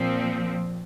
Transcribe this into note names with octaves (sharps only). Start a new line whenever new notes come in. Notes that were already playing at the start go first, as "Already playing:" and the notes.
Already playing: A#2 F3 C4